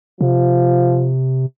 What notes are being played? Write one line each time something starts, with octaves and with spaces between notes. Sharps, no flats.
C3 F3